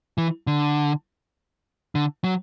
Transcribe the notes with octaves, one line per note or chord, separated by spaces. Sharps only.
E3
D3
D3
F#3